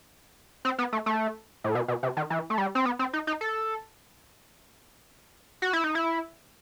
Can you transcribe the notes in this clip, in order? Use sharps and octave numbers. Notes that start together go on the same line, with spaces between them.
C4
B3
A3
A3
A2
B2
B2
C3
D#3
E3
A3
G3
C4
B3
C4
D#4
D#4
A4
F#4
E4
D#4
E4